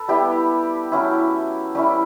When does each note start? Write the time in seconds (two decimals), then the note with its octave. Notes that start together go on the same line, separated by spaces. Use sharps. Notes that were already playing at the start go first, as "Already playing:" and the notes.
Already playing: A4 B4
0.08 G3 B3 E4 G4
0.92 F#3 C#4 E4
1.75 G3 C#4 E4 G4